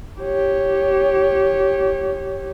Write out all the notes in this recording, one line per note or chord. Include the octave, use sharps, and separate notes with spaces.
G4 C#5